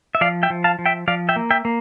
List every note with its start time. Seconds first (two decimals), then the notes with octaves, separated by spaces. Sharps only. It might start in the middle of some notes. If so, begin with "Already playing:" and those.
0.15 E5
0.21 F3 D5 F5
0.43 E5 G5
0.50 F3
0.64 F5 A5
0.79 F3
0.86 E5 G5
1.08 F3 D5 F5
1.29 E5 G5
1.36 A#3
1.51 E5 G5
1.65 A#3